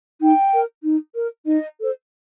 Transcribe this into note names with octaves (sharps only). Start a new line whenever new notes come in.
D#4 G5
A#4
D#4
A#4
D#4 D#5
A4 C5